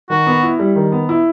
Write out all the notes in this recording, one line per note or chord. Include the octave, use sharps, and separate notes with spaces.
D#3 F#4
B3
E4
G3
D#3
B3
E4